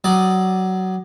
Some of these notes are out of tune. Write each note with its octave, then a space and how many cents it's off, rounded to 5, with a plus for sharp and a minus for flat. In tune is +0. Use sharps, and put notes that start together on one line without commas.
F#3 +20 D5 +10 D#6 +0